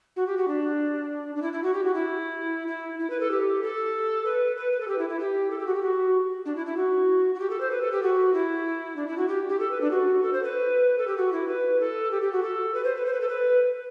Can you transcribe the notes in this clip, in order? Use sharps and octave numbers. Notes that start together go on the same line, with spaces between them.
F#4
G4
F#4
D4
D4
E4
E4
F#4
G4
F#4
E4
E4
E4
B4
A4
G4
A4
B4
B4
B4
A4
G4
E4
E4
G4
A4
G4
F#4
G4
F#4
D4
E4
E4
F#4
F#4
G4
A4
C5
B4
A4
G4
F#4
E4
D4
E4
F#4
G4
G4
A4
B4
D4
F#4
A4
C5
B4
A4
G4
F#4
E4
B4
A4
G4
G4
F#4
A4
B4
C5
B4
C5
B4
A4
B4